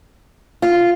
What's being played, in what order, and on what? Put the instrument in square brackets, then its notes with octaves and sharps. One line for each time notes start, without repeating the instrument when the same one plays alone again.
[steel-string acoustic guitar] F4